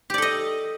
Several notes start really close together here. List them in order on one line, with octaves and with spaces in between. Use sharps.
G4 D5 A4 D#5